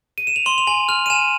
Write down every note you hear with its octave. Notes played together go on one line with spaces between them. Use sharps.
D#7
E7
F7
C6 F#7
F7
G#5 F#7
F6 F7
D#7
G#5 E7